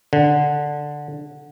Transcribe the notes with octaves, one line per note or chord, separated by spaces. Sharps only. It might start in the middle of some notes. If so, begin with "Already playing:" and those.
D3